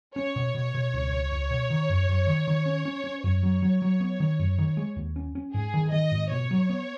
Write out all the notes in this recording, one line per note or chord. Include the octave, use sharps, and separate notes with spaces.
C#4 C#5
B2
B2
B2
C#2
C#2
C#2
B2
D#3
F#2
F#2
D#3
D#3
C#4
C#4
C#4
F#2 C#5
F#3
F#3
F#3
B3
D#3
F#2
D#3
G#3
D#2
C#4
C#4
G#2 G#4
D#3
D#3 D#5
G#2
B2 C#5
F#3
B3